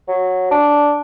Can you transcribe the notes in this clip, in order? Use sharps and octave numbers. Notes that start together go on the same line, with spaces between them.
F#3
D4